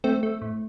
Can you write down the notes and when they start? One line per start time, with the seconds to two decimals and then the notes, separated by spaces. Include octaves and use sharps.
0.04 A3 C4
0.23 A3
0.42 A2